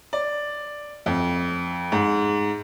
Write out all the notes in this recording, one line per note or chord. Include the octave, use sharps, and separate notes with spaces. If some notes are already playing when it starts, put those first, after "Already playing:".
D5
F2
G#2